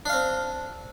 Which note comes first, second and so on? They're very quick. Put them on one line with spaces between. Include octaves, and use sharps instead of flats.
D4 F5 C4